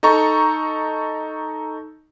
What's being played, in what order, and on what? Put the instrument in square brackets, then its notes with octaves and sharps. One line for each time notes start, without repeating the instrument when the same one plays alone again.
[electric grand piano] D#4 A4 A#5 C#6